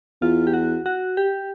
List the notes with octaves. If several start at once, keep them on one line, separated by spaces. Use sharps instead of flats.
E2 F4
G4
F#4
F#4
G4